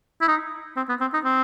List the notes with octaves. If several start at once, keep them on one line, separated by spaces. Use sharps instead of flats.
E4
D#4
C4
B3
C4
D#4
C4